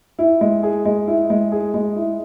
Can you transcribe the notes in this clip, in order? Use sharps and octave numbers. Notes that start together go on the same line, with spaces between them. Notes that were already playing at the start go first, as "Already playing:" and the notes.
E4
G#3
G#4
G#3
E4
G#3
G#4
G#3
E4